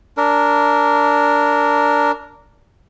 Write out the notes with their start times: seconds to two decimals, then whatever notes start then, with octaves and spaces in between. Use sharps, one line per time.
0.17 D4 A#4